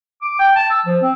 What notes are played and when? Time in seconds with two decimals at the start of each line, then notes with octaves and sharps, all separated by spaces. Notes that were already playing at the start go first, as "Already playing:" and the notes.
0.22 D6
0.39 G5
0.56 A5
0.70 E6
0.86 F3
1.02 C4